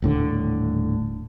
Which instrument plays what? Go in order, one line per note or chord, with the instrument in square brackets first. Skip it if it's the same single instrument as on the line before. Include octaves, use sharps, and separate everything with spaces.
[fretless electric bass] D#1 A2 D3